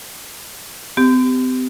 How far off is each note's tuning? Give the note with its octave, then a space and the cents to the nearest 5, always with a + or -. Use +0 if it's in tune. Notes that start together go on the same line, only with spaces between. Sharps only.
C4 -45 G4 +0